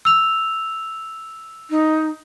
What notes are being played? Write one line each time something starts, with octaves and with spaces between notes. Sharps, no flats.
E6 F7
D#4